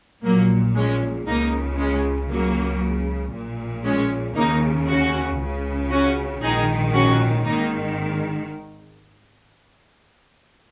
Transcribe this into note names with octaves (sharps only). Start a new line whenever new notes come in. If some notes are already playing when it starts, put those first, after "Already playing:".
A#1 A#2 F#3 A#3
G#3 C#4
C#2 C#3 A#3 D#4
G#3 C#4
C#2 C#3 F#3 A#3
A#1 A#2
G#3 C#4
D#2 C#3 A#3 D#4
C#4 F#4
C#2 C#3
C#4 F#4
A#1 G#2 D#3 D#4 G#4
C#4 F#4
G#1 G#2 D#3 A#3 D#4